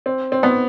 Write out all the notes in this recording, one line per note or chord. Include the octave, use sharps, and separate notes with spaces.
C4
C4
B3